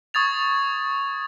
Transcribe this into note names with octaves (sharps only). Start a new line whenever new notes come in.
C#6 D#6 G#6 A6 F7